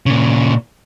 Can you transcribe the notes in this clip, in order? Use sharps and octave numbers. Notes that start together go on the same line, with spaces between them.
A#2 C#3